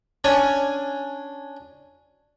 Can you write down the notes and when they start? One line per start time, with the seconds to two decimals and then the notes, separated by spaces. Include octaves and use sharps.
0.24 C#4 D4 C#5 G#5